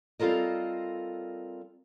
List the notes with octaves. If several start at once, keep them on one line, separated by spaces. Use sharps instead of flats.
G3 C4 F4 A4 A#4 D#5